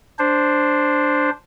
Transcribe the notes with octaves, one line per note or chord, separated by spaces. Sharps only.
D4 C5